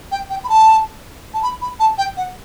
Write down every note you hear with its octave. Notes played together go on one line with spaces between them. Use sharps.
G5
G5
B5
A5
A5
B5
B5
A5
G5
F#5